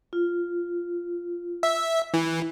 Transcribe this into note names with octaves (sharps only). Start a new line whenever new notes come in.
F4
E5
E3